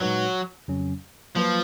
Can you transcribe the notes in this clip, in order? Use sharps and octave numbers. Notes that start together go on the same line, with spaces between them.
A#2 F#3 G#3 D#4 F#4 B4
F2 C#3 F#3 C#4
F3 F#3 A#3 F4 B4